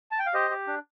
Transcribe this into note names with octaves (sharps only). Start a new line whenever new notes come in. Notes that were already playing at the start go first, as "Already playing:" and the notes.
A5
G5
F5
G4 C5 D#5
G4
D4